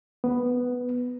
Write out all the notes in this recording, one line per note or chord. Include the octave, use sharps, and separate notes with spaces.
B3